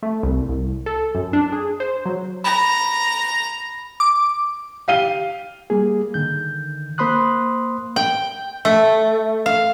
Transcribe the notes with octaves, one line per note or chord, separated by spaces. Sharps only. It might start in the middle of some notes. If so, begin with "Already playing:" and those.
A3
C2
C2
A4
F#2
D4
G#4
C5
F#3
A#5 B5
D6
G4 F5 D#7 G7
G3 A#3 G#4
D3 D#3 G6
A#3 C5 B5 C6 D#6 F#6
G5
A3
F5